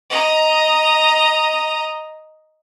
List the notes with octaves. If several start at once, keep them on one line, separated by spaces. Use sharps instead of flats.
D#5 A#5